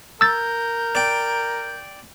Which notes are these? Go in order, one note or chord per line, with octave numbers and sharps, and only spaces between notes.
A#4 E6 G6 A6
D5 G5